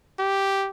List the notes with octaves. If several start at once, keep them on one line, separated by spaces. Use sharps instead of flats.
G4